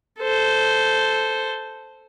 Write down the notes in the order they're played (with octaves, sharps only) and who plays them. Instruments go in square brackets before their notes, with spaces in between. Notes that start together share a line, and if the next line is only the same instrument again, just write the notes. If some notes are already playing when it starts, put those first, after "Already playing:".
[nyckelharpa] A4 C5